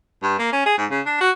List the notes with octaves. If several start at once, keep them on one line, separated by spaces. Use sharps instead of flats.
G2
A#3
C#4
G#4
G#2
C#3
D4
F#4